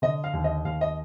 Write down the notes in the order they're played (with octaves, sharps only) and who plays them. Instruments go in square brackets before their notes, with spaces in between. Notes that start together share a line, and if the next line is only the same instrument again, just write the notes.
[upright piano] D3 D#5
F5
D#2
D#5
D#2 F5
D#5